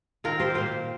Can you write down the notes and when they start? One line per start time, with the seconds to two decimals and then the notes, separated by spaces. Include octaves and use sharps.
0.24 D#3 C4 F4 A#4
0.40 G4 C5
0.54 A#2 A#3 G4 C5